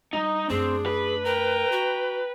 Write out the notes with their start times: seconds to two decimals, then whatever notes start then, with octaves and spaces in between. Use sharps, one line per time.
0.13 G3 D#4
0.50 F#2 A3 C4 D4 G#4
0.86 B4
1.25 A#4 G5 A#5
1.72 F#4